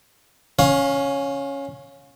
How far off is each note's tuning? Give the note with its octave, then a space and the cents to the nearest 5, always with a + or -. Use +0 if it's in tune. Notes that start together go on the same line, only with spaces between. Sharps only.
C#4 +0 C#5 -30 F5 +20